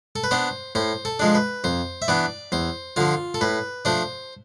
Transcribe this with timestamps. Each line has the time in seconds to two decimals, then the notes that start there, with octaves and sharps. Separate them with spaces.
0.16 A4
0.24 B4
0.31 B3 D4 C5
0.75 A2 C5
1.05 A4
1.20 F3 G#3 D4
1.35 B4
1.64 F2 C5
2.02 E5
2.08 E3 B3 D4 D5
2.52 E2 C5
2.96 D3 F3 F4
3.34 A4
3.41 A2 B4
3.85 F3 A3 D4 C5